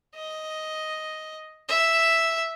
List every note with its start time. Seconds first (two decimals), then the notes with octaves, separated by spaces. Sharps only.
0.15 D#5
1.68 E5